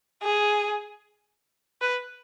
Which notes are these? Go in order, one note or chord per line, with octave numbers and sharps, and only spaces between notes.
G#4
B4